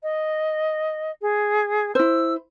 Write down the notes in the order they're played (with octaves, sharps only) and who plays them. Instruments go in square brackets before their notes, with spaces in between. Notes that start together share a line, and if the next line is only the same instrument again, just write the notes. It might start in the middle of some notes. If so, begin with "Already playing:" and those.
[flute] D#5
G#4
[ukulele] E4 C5 [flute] E6